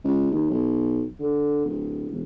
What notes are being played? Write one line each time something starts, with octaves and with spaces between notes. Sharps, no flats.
C#2
D#2
B1
D3
D1
E1